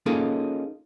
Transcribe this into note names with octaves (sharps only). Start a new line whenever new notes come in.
A#3 C#4 D#4 F4 G#4 A4